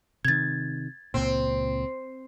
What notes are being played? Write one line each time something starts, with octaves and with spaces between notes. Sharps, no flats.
C3 D#3 G#6 A6
C#2 A#2 C4